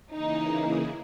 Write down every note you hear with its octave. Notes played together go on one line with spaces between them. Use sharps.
C#3 E3 A#3 D#4 E4 G#4